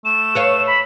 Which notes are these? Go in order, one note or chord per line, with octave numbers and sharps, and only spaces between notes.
A3 E7
B4 C#5 F5
B5